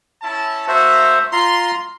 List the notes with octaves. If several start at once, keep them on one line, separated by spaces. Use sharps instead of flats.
C#4 E4 A5
A3 A#3 F#4 C5 E5
F4 A#5 C6